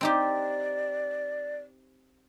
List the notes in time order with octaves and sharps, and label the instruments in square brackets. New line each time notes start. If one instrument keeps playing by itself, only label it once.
[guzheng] C4 D#4 G4 [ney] D5